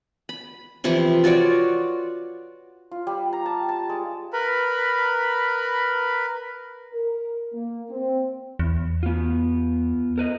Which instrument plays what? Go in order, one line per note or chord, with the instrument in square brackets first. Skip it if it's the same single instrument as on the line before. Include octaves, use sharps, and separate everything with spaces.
[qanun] B5
C3 E3 F3 E4
F4 F#4 C#5 D5
[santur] F4
G3
A#5
A5
A5
G#3
[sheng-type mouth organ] A#4 B4 B5
[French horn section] A#4
A#3
C4
[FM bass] E2
[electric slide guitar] B3 F4
A#4 B4 D#5